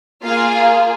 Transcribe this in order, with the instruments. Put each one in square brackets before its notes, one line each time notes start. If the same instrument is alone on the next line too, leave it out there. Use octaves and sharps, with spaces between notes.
[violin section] A#3 F4 G#4 F5